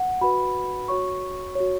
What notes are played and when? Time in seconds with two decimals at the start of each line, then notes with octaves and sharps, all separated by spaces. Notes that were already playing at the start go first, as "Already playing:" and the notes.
Already playing: F#5
0.21 F#4 B4 B5
0.88 F#4 C#5 C#6
1.55 C#5
1.60 F#4